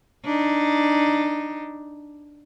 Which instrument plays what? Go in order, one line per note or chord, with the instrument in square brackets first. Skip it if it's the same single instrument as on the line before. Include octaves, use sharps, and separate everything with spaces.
[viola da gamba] D4 D#4